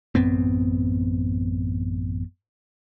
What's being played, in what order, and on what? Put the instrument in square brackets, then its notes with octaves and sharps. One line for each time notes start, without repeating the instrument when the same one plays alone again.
[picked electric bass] A1 F#2 B3 C4